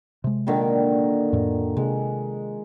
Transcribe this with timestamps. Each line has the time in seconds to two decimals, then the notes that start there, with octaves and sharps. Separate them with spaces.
0.24 C3 G#3
0.47 A#2 D3 D#3
1.33 F2 A2
1.77 C3 G#3